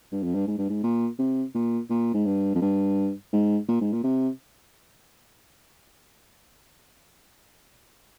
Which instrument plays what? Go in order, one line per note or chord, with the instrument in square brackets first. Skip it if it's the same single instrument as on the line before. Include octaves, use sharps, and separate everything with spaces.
[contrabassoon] G2
F2
G2
G#2
G2
G#2
A#2
C3
A#2
A#2
G#2
G2
F2
G2
G#2
A#2
G#2
A#2
C3